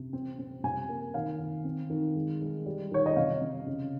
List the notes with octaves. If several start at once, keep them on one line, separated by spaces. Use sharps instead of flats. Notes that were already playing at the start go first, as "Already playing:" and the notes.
Already playing: C3
C4
C4
C3 G#5
A#3
D#3 F5
D#3
C4
D#3
G#3
G#3
G3
D#3 C#5
D#5
C3 F5
C3
C#3